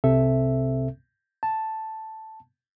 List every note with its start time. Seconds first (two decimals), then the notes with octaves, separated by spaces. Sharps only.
0.04 C2 C3 C4 A4 E5
1.43 A5